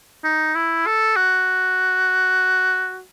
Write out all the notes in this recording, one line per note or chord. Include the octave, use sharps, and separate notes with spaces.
D#4
E4
A4
F#4